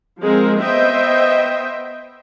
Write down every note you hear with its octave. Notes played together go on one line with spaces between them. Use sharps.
F3 G#3 C4 A#4
B3 C5 D#5 E5 G5